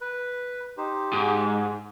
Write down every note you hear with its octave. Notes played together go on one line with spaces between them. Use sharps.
B4
D#4 G4 C5
G#2